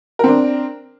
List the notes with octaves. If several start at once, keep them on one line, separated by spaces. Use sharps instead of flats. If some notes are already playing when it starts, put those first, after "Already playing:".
C4 D4 A#4